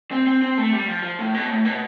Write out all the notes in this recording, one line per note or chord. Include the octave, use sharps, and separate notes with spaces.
C4
C4
C4
A3
G3
F3
F3
A2
B2
A2
B2